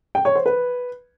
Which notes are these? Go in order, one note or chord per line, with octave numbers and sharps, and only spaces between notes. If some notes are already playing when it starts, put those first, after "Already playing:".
G5
C#5
C5
B4